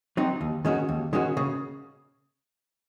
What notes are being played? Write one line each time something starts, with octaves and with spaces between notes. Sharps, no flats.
F#3 C4 D#4
D#2
D#3 G#3 C#4 F#4
D#2
D#3 G#3 C#4 F#4
C#3